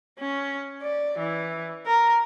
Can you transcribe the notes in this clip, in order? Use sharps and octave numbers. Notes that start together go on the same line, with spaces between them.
C#4
D5
E3
A#4